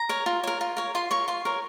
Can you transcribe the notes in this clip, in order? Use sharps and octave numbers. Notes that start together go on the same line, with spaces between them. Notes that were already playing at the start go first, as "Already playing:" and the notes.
Already playing: A#5
A#4 C#5
F4
A#4 C#5
F4
A#4 C#5
F4 C6
A#4 C#5 C#6
F4 C6
A#4 C#5